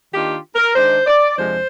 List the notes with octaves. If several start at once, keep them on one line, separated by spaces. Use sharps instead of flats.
D#3 A#3 D4 F4 G4
A#4
D#3 G#3 D4 C5
D5
F2 C3 F3 G#3 D4 C5